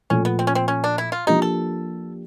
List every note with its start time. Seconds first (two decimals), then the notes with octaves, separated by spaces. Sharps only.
0.10 A#2 F3 A3 C#4
0.25 B3
0.39 C4
0.47 C#4
0.55 C4
0.68 C#4
0.84 D4
0.98 E4
1.12 F4
1.27 F3 A#3 D4 D#4 G4
1.42 A4